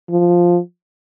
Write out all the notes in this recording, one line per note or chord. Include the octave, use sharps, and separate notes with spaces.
F3